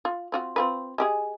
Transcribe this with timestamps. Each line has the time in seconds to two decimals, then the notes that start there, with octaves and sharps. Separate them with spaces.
0.05 F4
0.32 C4 F4 F#4
0.56 C4 F4 B4
0.98 G#3 G4 G#4